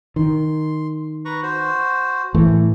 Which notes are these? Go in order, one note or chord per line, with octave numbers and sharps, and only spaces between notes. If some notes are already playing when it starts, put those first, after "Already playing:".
D#3 C6
B4 A#5 C#6
F#4 C5
A2 E3 A3